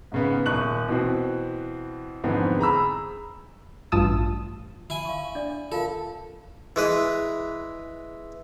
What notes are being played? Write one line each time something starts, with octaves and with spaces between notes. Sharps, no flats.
G#2 C#3 B3
D#1 C#6 F#6 F#7
B2 E3 C4
F2 G#2 D3 E3 B3 C4
G#4 A#5 B5 E6
A1 G2 F4 A5 D#6 E6
E4 G#5
F5 C#6
D4 D5
F4 A4 A#4 F5
E3 G#3 B4